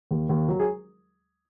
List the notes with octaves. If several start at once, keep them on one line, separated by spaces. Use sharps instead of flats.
D#2
D#2
F#3
G#4